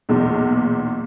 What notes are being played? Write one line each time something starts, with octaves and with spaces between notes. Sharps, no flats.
B1 E2 A#2